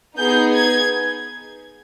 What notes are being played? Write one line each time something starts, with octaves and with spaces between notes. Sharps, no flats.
B3 D#4 G#4 G6
G#6